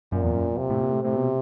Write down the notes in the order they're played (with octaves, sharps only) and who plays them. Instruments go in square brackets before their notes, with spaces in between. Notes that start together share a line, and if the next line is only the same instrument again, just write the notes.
[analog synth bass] F#2 [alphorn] A#2
[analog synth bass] E2
F#2
[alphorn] C3
[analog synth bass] A2
A#2
A2
[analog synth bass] A2 [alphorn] C3
[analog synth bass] B2